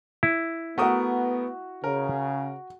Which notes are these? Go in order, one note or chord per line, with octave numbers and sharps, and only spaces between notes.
E4
A3 B3 F#4 A#4 F#5 D#6
C#3 A#4